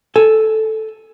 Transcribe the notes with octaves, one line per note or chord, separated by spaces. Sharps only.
A4 G#5